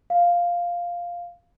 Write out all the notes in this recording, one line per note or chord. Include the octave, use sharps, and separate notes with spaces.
F5